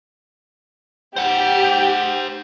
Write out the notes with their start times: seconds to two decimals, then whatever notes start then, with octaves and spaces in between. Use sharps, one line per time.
1.16 G4 C5 F#5